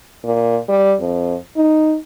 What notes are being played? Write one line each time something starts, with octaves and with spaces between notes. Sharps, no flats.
A#2
G3
F2
D#4